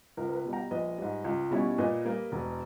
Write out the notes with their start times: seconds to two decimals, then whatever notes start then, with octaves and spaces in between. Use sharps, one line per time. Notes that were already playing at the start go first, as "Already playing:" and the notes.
0.17 C#2 A#4
0.29 A#4
0.35 B4
0.45 B2 G3
0.53 G5 A#5
0.71 A#1 B4 D#5
0.98 G#2 G3
1.24 C#2
1.51 B2 G3 C#4 E4
1.78 A#2 B4 D#5
2.05 G3 A#3
2.32 E1